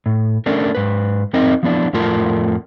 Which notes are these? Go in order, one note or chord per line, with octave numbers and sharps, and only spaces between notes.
A2
A3 C#4 D4 A4 A#4
G#2 B4
F2 C4 D#4 A#4 D#5
F3 B3 D4 E4
F2 A2 A3 F4 A#4 A5